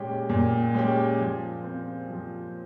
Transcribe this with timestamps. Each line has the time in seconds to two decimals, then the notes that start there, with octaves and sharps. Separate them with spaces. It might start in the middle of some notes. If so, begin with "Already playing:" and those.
Already playing: A#2 G#3 C#4 G4
0.29 A#2
0.74 G#3 C#4 G4
1.19 F3
1.64 C4 F4
2.09 F3